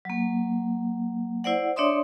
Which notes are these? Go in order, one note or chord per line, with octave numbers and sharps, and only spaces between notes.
F#3 A#3
E4 C5 D5 F#5
D4 C#5 D5 E5 C6 D#6